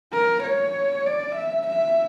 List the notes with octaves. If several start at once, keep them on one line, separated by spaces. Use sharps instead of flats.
A#4
C#5
D5
E5
E5